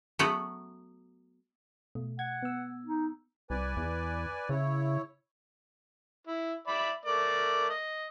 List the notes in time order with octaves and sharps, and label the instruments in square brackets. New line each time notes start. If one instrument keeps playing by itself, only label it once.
[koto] F#3 A3 B3 F#4
[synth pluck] B2 A3
[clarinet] F#5 [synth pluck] G#6
[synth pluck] B3 E6
[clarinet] D#4
[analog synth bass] C2 [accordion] B4 D5 G#5
[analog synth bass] E2
[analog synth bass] C#3 [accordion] E4 C#5
[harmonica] E4
D5 E5 B5
A3 A#4 D5
D#5